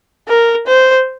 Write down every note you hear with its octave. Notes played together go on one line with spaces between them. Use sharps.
A#4
C5